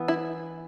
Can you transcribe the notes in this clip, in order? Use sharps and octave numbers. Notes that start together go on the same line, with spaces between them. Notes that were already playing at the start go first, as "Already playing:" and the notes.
Already playing: E3 B3
E4